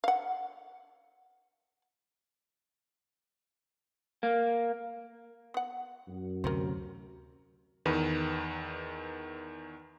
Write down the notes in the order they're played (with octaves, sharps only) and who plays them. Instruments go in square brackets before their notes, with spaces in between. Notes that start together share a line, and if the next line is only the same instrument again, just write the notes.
[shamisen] F5 F#5
[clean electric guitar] A#3
[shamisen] B3 F#5
[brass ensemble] F#2
[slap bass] D2 C3 [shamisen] A#4 C5
[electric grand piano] E2 D#3 B4